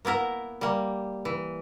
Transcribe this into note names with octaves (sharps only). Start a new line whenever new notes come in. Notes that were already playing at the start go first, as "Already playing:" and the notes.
A#3 B3 E4 A#4
G3 A#3
E3